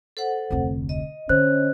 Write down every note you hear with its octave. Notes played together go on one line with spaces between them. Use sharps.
A4 C5 F#5
F1 D2
D#5
D3 C#4 C5 F#6